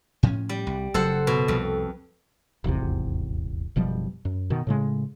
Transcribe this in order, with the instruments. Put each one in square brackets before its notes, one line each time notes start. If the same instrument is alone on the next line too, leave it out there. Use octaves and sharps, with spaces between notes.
[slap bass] A2 F3 C#4
[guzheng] G3
[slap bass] C2
[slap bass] F#1 C#3 F#3 [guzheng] A4 C5 F#5
[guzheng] B2
[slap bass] C2 [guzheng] F2
[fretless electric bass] D#1 G#1 E2 C3
F#1 B2 F3 G3
F#2
B2 D#3
A2 C#3 G#3